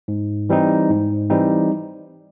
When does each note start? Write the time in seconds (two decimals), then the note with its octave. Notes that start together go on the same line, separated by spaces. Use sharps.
0.08 G#2
0.49 E3 G3 C4 D#4
0.90 G#2
1.30 E3 G3 C4 D#4